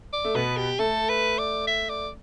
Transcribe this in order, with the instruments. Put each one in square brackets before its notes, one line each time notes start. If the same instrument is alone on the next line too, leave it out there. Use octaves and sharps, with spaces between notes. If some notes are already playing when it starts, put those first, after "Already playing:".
[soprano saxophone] D5
[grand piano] A3
[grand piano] B2 B3 [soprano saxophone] B4
[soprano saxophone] G4
[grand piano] A3 [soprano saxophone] A4
[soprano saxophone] B4
D5
E5
D5